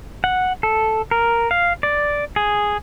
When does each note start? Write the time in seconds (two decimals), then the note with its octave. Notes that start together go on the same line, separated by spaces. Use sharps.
0.24 F#5
0.63 A4
1.11 A#4
1.51 F5
1.83 D5
2.36 G#4